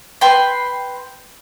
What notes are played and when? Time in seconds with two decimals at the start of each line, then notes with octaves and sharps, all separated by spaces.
0.21 B4 G5 C6